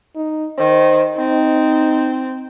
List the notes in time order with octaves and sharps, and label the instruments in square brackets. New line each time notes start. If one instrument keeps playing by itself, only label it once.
[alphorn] D#4
[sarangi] D#3 [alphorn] C5
[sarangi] C4 [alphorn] D#4